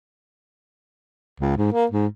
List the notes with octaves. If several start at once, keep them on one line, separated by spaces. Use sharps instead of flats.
C#2
G#2
A#3
G#2